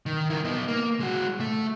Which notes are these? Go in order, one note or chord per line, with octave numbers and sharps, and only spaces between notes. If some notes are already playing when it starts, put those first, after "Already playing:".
D#3
E4 A#4
B3 D#4
A#3
G#3 F#4
A3